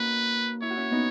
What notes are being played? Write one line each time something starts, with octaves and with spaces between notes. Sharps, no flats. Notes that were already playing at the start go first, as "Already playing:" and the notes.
Already playing: A#3 C#4 D#4 F#4 B4
E4 C#5
F#4
C#4 E4
B3 D#4